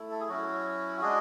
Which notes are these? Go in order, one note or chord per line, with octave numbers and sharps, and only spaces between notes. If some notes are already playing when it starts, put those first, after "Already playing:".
Already playing: A3 E4
A4
G#4
F#3 C#4 E4 F#4
G#3 D4 F#4 G#4